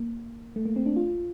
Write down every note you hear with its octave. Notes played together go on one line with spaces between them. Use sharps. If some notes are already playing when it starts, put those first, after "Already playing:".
Already playing: A#3
A3
A#3
C4
D4
F4